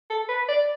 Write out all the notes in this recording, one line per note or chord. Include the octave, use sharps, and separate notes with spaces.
A4
B4
D5